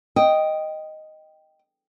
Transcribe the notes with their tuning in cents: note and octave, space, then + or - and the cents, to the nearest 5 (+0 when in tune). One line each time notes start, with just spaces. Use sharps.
D#5 +0 G5 +0